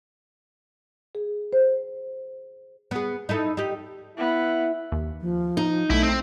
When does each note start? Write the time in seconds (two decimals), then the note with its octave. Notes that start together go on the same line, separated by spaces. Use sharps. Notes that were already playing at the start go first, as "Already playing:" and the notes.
1.15 G#4
1.53 C5
2.91 B3 G#4
3.29 D#4 E4 A4
3.57 D#4 G4
4.18 B3 E4
4.92 D#2
5.21 F3
5.57 D#4
5.90 B1 A3 E4
6.03 C4